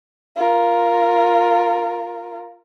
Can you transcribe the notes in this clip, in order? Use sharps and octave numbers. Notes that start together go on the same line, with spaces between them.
F4 A#4